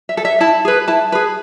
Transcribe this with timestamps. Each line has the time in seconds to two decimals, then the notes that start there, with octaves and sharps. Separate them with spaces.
0.09 E5
0.17 A4
0.25 E5
0.41 E4 A5
0.65 G#4 B4
0.88 E4 A5
1.12 G#4 B4